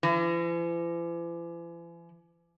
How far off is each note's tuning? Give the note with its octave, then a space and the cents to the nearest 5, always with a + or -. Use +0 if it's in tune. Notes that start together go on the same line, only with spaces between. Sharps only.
E3 +45